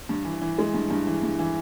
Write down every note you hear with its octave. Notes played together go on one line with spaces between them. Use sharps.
G2
E3
E3
G#3
G2
G2
E3
G2
E3